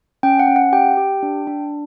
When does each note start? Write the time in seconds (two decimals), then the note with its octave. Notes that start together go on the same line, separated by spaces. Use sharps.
0.23 C#4 G5
0.39 F#5
0.48 C#4
0.56 F#5
0.73 G4 G5
0.97 G4
1.23 D4
1.47 D4